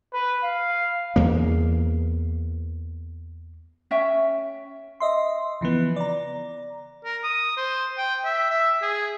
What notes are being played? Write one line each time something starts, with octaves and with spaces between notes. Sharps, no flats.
B4
F5
E2 A#3
C#4 C#5 E5 G5
D#5 E5 C6
C#3 E3 F3 B3
D5 A#5
A#4
D#6
C5
G5
E5
E5
G#4